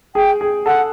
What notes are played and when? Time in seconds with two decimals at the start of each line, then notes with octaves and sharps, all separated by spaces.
0.15 G#4 G5
0.41 G#4
0.66 A4 F#5